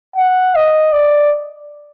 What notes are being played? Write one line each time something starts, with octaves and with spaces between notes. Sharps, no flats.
F#5
D#5
D5